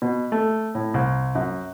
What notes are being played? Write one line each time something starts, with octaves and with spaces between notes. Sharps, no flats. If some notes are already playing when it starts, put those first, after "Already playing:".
B2
A3
A2
C2
F#2